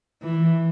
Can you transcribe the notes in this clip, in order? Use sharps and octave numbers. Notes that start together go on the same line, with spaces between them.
E3